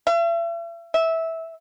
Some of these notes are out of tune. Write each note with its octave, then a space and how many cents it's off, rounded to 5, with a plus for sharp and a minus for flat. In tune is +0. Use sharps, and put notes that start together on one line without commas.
E5 +40
E5 -15